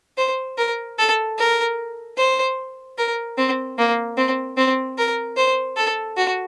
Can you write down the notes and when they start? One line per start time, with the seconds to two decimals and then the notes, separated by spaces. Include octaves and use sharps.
0.18 C5
0.58 A#4
0.99 A4
1.38 A#4
2.18 C5
2.98 A#4
3.38 C4
3.78 A#3
4.17 C4
4.57 C4
4.98 A#4
5.37 C5
5.77 A4
6.17 F#4